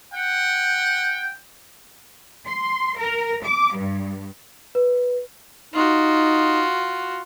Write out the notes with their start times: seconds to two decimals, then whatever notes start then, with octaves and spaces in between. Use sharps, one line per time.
0.14 F#5 G5
2.47 C6
2.98 A#4
3.44 D6
3.77 G2
4.75 B4
5.74 D#4 F4 F#4